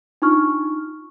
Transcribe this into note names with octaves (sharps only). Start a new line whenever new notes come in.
D4 D#4 F4 C#6 F6